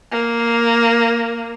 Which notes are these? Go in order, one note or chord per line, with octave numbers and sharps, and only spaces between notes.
A#3